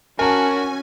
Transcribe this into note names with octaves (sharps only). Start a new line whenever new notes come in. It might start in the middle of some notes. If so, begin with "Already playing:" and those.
C#4 F#4 A#4 G#5 A5